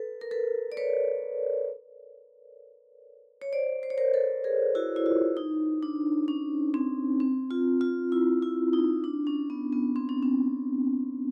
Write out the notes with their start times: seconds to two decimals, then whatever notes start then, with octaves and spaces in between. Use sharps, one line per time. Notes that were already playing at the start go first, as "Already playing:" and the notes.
Already playing: A4 B4
0.21 A#4
0.31 A4 B4
0.72 D5
0.77 B4 C#5
3.42 C#5
3.53 C5 D5
3.83 C5
3.90 C#5
3.98 A#4 C5
4.14 A4 B4
4.44 G#4 A#4
4.75 E4 F#4
4.96 E4
5.06 F4
5.37 D#4
5.83 D4
6.28 C#4
6.74 C4
7.20 C4
7.51 F4
7.81 F4
8.12 E4
8.42 E4
8.73 D#4
9.04 D4
9.27 C#4
9.50 B3
9.73 B3
9.96 C4
10.09 C#4
10.23 C4